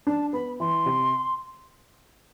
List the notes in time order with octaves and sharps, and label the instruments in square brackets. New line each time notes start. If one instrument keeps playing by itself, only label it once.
[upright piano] D4 [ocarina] A5
[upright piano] B3 [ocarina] B5
[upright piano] E3 [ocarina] C6
[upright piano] C3